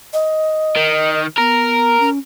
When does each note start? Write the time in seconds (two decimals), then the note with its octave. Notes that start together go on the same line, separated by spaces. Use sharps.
0.13 D#5
0.77 D#3
1.38 B3 A#4
2.00 C#4